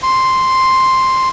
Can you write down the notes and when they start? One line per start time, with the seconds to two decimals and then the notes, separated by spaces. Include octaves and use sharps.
0.03 C6